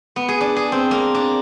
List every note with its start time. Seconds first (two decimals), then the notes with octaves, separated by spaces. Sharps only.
0.16 B3
0.29 G#4
0.41 D4
0.56 G#4
0.72 C4
0.91 A#3
1.15 D4